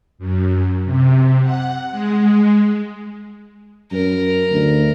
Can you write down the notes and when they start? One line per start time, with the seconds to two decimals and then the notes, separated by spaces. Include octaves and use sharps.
0.19 F#2
0.85 C3
1.42 F#5
1.91 G#3
3.92 F#2 A#4
4.51 D2